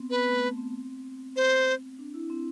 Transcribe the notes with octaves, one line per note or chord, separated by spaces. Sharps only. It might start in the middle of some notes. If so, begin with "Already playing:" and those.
Already playing: B3 C4
B3 B4
A3
B3
C4
C5
D4
E4
C4